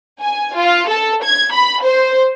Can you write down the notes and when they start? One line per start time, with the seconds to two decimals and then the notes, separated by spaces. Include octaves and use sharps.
0.21 G#5
0.56 F4
0.89 A4
1.24 G#6
1.53 B5
1.83 C5